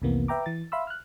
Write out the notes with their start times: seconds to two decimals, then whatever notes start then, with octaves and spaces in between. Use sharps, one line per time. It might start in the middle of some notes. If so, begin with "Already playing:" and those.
0.02 C2 F2 C3 E3 A#3 B3
0.28 B4 E5 G5 A#5 D6
0.46 E3 A6
0.72 E5 F5 B5 C6 E6
0.87 F6 F#6